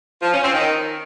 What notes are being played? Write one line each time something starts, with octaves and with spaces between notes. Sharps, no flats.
F3
C#4
C4
D#3